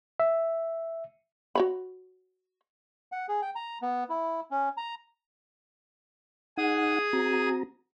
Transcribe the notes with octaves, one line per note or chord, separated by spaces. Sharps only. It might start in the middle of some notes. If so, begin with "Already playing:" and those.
E5
F#4 C#5 B5
F#5
G#4
G5
A#5
B3
E4
C#4
A#5
D#4 G#4 F#5 D#6
C4 F#4 A#5